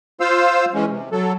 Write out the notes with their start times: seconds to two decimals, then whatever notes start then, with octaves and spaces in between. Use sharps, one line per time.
0.20 F4 C5 F5 E6
0.74 E3 G#3 C#4
0.90 C3
1.12 F#3 A4